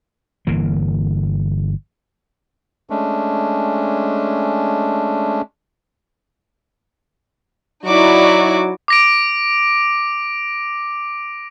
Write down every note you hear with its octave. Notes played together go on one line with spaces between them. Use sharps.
G1 E3 A#3
G#3 A3 C#4 D4
F#3 D#4 E4 F#4 D5 D6
D6 A#6 D7